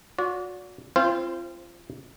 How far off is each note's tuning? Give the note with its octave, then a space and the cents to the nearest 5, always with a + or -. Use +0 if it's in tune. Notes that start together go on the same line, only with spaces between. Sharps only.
F#4 -35 D5 -40
C4 +20 F4 -30 C5 -5